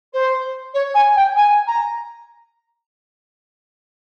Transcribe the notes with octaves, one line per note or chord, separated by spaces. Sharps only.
C5
C#5
G#5
G5
G#5
A#5